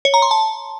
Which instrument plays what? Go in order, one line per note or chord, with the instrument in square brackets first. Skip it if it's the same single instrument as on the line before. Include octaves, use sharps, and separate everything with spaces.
[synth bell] C#5
A#5
C6
A5